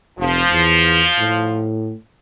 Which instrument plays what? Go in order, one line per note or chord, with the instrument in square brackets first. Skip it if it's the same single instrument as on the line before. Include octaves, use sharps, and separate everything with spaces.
[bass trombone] F1 [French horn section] F3
[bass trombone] E2
A2